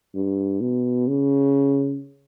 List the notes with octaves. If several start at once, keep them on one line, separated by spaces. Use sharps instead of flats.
G2
B2
C#3